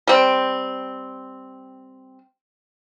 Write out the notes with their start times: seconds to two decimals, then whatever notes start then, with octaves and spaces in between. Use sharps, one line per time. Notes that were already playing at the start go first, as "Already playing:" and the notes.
0.07 G3 C4